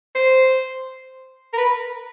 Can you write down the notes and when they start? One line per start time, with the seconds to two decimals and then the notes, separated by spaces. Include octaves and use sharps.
0.15 C5
1.53 A#4
1.58 B4